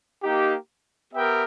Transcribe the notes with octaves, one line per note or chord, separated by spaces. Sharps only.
A#3 D#4 G4
B3 G4 A#4 E5 G5